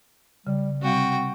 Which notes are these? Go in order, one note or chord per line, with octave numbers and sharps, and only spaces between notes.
C#3 G3
C3 G3 C4 F#4 F5 G5